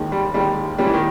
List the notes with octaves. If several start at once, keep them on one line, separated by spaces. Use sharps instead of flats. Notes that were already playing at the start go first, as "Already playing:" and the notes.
Already playing: D#2 D#3 G#3
G3
D#2 D#3 G3 G#3
A#2 G3 G#3 C#4
E3
D#3